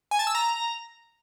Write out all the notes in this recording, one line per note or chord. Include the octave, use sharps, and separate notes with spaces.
G#5
A5
E6
A#5